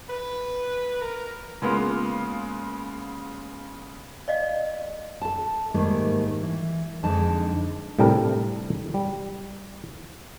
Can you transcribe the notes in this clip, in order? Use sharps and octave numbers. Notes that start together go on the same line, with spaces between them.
B4
A#4
C#3 G#3 A#3 B3 F4
D5 D#5 F5
A4 A5
G#2 D#3 G3 A3 A#3
E3
F2 D3 G#3 D#4 A5
A2 C3 G3 D4 A4 A#4
G3